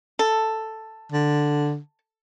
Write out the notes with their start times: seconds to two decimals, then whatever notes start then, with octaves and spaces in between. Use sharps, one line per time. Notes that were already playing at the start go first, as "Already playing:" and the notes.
0.19 A4
1.12 D3